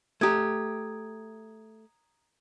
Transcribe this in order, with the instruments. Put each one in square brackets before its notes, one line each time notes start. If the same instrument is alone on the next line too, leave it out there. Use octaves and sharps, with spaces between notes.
[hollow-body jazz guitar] A3 G4 [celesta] A#5 D#6 G#6